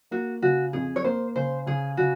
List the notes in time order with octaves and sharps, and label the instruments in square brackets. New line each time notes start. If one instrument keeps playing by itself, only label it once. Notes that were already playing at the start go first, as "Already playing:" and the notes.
[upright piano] A#3 [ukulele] F#4
[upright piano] C#3 [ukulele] F#4
[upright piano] F2 [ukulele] G#4
[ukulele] C#5
[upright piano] A#3 [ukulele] C5
[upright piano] C#3 [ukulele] C5
[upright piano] C#3 [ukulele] G#4
[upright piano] C#3 [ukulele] F#4